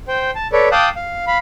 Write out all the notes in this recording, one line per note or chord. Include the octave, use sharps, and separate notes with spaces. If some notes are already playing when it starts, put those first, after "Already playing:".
C5 G5
A5
A4 B4 C#5 D5
F5 G5 A5 D6 D#6 F#6
F5
F5 B5